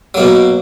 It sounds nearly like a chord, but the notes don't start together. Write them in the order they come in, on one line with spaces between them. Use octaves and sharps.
F#3 A#3 B2